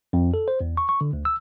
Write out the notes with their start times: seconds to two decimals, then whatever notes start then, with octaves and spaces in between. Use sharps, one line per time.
0.13 F2
0.34 A4
0.48 C5
0.61 E2
0.77 C#6
0.89 C#6
1.01 D3
1.13 D2
1.25 E6